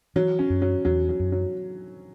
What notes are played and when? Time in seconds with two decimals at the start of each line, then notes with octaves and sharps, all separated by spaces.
0.16 E3 F#3
0.39 C#4
0.50 F#2
0.62 F#3
0.85 E2 F#3
1.09 F#3
1.20 F#2
1.32 F#3